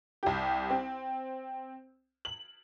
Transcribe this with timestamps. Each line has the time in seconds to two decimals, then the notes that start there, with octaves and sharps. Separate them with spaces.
0.23 C2 G4
0.70 C4
2.25 F#7